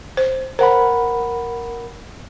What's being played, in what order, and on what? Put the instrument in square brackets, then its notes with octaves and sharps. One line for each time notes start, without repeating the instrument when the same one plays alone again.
[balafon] C5
[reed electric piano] A#4 F#5 B5 [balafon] C5